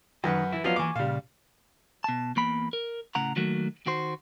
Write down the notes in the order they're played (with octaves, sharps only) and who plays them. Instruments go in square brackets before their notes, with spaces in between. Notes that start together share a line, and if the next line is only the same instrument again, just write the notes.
[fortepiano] F#2 B4 F#5 [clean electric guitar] D#3 D#4
[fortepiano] E3 [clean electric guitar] E4
[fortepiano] F3 F#3 B3 [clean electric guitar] D5 D#5 F5
[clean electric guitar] E3 A#3 [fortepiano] G#5 C#6 D6
[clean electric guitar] A#2 C#3 [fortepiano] G3 F5
[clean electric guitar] B2 A5
E2 A#3 B5
A#4
A2 C#3 F#5 A#5
D#3 F#3 A3 A#3 F#4
D#3 F#4 C5